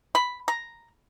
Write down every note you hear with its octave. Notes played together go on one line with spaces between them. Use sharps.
B5
A#5